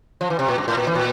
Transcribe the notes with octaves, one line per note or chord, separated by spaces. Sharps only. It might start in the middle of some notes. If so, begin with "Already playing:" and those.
F3
E3
C3
A#2
G2
A2
A#2
E3
A#2